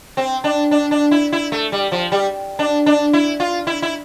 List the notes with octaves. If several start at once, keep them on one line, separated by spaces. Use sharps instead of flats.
C4
D4
D4
D4
E4
E4
A3
G3
F3
G3
D4
D4
E4
F4
E4
E4